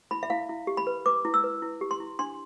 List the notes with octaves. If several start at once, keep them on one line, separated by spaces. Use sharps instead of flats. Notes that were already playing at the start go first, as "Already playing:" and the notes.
E4 B5
E5
E4 F5
E4
G4
B5
B4
B4 D6
E4
E6
B4
E4
G4
C6
E4
D4 C6